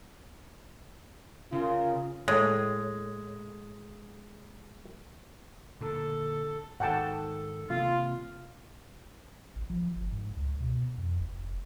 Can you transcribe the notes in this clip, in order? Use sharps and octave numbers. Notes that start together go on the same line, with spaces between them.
C#3 F4 A#4
A2 G#3
A#2 D3 A4
G#2 D#3 A4 F#5 G5 A5
C3 A#3 F4
A1
F3
G1
G#2
C#2
B2
F2
F1